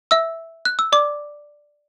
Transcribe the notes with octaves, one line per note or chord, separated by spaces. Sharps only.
E5 E6
F#6
E6
D5 D6